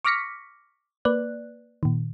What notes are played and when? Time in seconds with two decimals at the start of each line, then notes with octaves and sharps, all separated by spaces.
0.05 C#6 D6 F6 A#6 B6 C#7
1.05 A#3 B4 D5 F#6
1.83 A#2 D#3